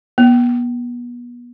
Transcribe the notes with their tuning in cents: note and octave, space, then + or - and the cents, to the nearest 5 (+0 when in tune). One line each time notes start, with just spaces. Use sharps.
B3 -30